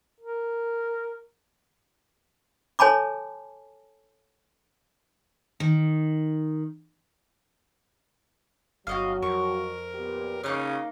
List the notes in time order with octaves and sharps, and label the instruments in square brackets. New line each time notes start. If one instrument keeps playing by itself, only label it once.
[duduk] A#4
[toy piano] A4 C#5 G#5 A5 B5 D6
[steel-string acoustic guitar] D#3
[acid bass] G1 [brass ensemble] F#3 [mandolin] F#4 D#5 F5
[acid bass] F2 [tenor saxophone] A#4 [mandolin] C#6
[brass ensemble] A#2 B3 G4
[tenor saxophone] C#3 [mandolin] A#3 D#4 F5 [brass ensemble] C#5